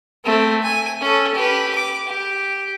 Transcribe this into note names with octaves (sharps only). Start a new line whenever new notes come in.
A3 C4
G#5
C#4 A4
G4 B4
D6
G4